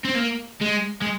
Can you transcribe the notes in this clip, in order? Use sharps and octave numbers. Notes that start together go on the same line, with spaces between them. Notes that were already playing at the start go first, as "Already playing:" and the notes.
C4
A#3
G#3
G#3